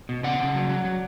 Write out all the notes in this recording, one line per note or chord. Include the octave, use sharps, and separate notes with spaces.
B2
C#3 D5 F#5
C#3
F#3
F#3
F#3